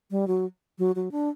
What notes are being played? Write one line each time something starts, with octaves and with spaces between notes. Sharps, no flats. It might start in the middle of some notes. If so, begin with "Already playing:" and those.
G3
F#3
F#3
F#3
D4